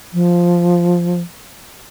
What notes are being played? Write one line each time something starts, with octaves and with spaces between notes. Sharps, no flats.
F3